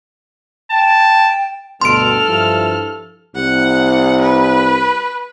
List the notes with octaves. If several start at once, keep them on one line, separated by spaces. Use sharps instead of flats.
G5 A5
D2 G2 B2 A4 C6 F6 D7
G2 F3 E4
C2 F#5
B4